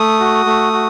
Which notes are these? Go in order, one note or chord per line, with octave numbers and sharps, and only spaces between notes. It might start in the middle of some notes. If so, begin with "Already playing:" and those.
Already playing: A3 D#6
F#4
A3
F#4